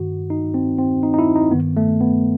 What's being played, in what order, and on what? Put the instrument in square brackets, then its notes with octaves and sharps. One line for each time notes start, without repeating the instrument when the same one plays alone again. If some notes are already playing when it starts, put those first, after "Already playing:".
Already playing: [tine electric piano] G2 D#3 F#4
D#4
C4
C4
D#4
D#4
E4
D#4
G2 D#3 B3
A3
B3